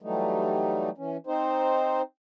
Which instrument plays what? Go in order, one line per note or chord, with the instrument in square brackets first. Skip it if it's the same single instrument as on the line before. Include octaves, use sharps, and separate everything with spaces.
[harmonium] E3 F#3 G3 A3 D#4
E3 C#4
C4 D#4 C5